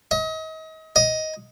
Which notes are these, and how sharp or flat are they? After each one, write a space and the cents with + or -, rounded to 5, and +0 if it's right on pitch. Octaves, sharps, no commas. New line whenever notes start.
D#5 +35
D#5 +10